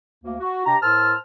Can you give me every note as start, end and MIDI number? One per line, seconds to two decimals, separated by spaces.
0.24 0.34 38
0.24 0.34 58
0.39 0.65 66
0.66 0.76 48
0.66 0.76 62
0.66 0.76 67
0.66 0.76 82
0.82 1.13 45
0.82 1.13 70
0.82 1.13 72
0.82 1.13 81
0.82 1.13 88
0.82 1.13 89